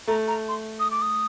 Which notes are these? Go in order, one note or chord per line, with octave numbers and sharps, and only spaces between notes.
A3 A#5
A#5
C6
D#6
D6
D#6